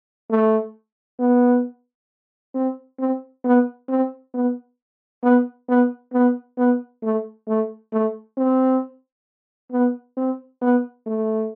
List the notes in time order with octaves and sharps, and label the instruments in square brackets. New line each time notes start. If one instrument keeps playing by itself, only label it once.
[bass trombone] A3
B3
C4
C4
B3
C4
B3
B3
B3
B3
B3
A3
A3
A3
C4
B3
C4
B3
A3